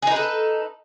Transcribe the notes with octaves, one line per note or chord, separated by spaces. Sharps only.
D#4 G#4 A4 B4